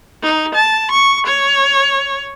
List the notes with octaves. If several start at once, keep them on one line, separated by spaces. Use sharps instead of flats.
D#4
A5
C#6
C#5